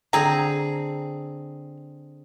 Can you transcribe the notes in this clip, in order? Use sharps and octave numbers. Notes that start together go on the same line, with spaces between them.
D3 C4 G#4 A#5